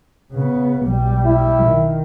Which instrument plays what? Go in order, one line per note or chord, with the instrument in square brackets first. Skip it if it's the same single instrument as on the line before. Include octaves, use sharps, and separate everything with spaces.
[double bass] C#3 B3
B1 G3
[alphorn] E4
[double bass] D#3